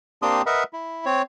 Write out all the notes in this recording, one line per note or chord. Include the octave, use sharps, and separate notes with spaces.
A#3 C4 D4 G4 C6 D#6
A#4 B4 D#5 E5 F#5 B5
E4
C4 C#5